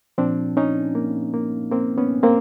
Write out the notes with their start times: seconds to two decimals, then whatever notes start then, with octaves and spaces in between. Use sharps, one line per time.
0.18 A#2 F3 C4 D4
0.57 C#4 D#4
0.95 A#3
1.34 A#3
1.72 A#3 C4
1.98 B3 C#4
2.23 A#3 C4